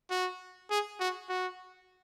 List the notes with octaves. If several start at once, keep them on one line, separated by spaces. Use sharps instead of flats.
F#4
G#4
F#4
F#4